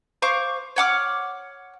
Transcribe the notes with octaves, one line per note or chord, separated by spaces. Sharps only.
C5 F5 C#6 D6
C#5 F#5 D6 F6